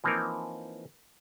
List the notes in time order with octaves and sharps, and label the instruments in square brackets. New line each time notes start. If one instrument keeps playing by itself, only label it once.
[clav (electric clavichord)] E3 F3 A#3 C4 D#4 A#4